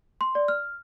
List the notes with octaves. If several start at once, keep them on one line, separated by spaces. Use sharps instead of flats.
C6
D5
F6